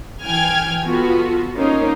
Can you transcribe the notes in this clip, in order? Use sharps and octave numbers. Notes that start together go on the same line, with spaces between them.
E3 G5 G#5 F6 G#6
B3 F4 F#4 A4
A#3 C#4 D#4 A#4 C5